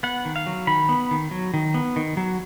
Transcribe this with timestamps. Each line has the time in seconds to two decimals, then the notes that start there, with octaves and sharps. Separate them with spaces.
0.03 B3 F#5
0.25 D#3
0.36 F5
0.47 F#3
0.67 D#3 B5
0.89 B3
1.11 D#3
1.31 F#3
1.54 D#3
1.74 B3
1.96 D#3
2.17 F#3